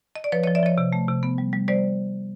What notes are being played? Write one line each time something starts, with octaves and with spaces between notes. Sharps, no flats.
D#5
D5
F3 B4 C#5
C#5 D#5
F3
D5 E5
F3 C#5 D#5
C3
A3
C3
B3
G3
G3
G3 C5 D5